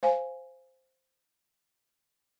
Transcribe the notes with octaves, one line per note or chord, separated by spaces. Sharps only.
C5 F5 G#5